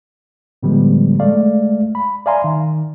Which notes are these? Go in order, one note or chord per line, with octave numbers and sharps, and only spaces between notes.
A2 D3 F3 G3 G#3 B3
G#3 A3 D5 F5
B5
D5 E5 F5 G#5 A#5 C6
D#3